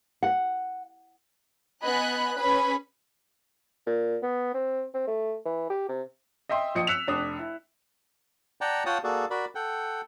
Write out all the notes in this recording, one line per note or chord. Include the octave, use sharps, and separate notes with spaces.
F#5
B3 D#5 G#5 B5 F#6
C#4 G#4 B4 B5
A#2
B3
C4
C4
A3
E3
G4
C3
D#5 E5 G5 C6 D#6
A#1 F3 D#5 D#6 C#7
E6 F#6 B6 C#7 E7 F7
F1 D4 D#6
E4
D5 F#5 G5 A5 A#5
F4 C#5 F#5 G5 A5 D#6
A#3 F#4 G#4 A4 D5
F#4 A#4 D5 B5
A4 F#5 G5